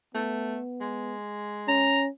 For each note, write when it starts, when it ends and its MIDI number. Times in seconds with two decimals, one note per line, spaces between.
0.15 0.60 57
0.15 1.16 59
0.81 1.98 56
1.68 2.09 61
1.68 2.03 82